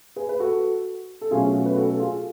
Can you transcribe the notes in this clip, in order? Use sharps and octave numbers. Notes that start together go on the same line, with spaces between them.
G#4 B4
B4
F#4 A4
A4
B2 F#3 A3 C#4 F4 G#4
F#4
B4
F#4 A4
A4
F4 G#4